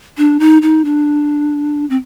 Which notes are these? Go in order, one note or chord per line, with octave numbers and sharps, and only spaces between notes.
D4
D#4
D#4
D4
C4